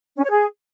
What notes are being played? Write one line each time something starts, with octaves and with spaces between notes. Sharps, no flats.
C#4
C#5
G#4